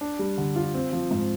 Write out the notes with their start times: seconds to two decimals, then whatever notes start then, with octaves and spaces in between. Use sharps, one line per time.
0.01 D4
0.19 G3
0.38 D3
0.56 F4
0.74 C4
0.93 F3
1.11 G#2